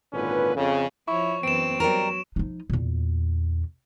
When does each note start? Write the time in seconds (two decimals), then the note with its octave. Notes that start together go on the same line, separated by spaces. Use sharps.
0.13 G#1 A#2 D3 C#4 F4 B4
0.55 F2 C#3
1.08 F3 E4 C#5 C#6
1.43 F#2 E3 B3 C4 D7 E7
1.80 F#3 G3 A#4
2.36 F3 D#4
2.70 E2 A#2